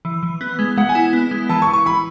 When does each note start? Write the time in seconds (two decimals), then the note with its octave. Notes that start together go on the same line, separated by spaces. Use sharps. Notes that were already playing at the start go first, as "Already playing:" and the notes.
0.05 E3
0.23 E3
0.41 B3
0.59 G#3
0.77 G#3 F#5
0.89 G#5
0.95 E4
1.13 B3
1.31 G#3
1.49 E3 A5
1.62 C#6
1.67 E3
1.73 C#6
1.86 E3 B5